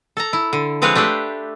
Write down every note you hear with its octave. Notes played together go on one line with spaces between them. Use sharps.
A4 A5 A#5
E4
D3
F3 G#3 C4 B4 C#5 F5
A3 D4 G4 B4 C5